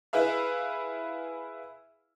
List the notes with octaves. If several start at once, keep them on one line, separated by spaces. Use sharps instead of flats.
E4 G#4 B4 E5 F5